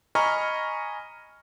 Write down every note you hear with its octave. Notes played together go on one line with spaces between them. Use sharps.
D#5 G#5 A#5 B5 C#6 F6